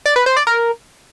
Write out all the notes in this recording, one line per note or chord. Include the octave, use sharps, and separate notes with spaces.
D5
B4
C5
D5
A#4